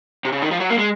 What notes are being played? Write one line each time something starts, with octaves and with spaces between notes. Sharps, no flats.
C3
C#3
D#3
F3
F#3
A#3
G#3